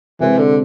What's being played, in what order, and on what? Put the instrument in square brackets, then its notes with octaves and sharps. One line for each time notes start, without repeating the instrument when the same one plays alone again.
[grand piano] C3 G#3 C4 [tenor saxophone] E3
[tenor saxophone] D3